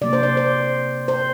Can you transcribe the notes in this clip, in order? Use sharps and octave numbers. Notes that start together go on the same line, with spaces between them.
C3 F#3 A#3 D5
C5
D5
C5
C5